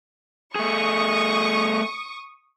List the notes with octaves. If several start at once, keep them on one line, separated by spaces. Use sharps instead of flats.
A3 G#4 C#6 D#6